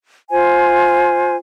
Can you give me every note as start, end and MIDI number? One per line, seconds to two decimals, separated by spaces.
0.31 1.36 65
0.31 1.36 72
0.31 1.36 80